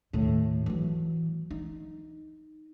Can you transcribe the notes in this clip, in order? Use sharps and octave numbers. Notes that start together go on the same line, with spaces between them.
D#2 A2
E3 F#3
D#4